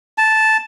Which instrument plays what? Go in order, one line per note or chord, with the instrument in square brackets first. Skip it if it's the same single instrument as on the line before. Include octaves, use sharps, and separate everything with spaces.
[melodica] A5